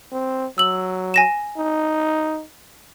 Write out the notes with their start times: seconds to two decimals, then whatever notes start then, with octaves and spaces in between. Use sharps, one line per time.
0.12 C4
0.58 F#3 E6 F#7
1.14 G#5 A#6 E7
1.57 D#4